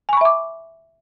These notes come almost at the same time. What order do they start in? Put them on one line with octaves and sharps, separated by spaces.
G#5 C#6 B5 E5 D6